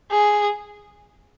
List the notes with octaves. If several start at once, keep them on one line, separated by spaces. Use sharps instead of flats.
G#4